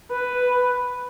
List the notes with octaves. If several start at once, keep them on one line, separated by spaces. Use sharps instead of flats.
B4